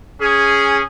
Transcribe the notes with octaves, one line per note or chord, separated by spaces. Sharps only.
C#4 G#4